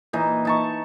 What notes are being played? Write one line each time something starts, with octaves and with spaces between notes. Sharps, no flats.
A#2 E3 D#4
D#4 A5 C#6